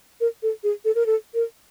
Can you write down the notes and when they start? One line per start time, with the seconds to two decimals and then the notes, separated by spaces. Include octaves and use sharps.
0.21 A#4
0.43 A4
0.63 G#4
0.85 A4
0.95 A#4
1.06 A4
1.34 A#4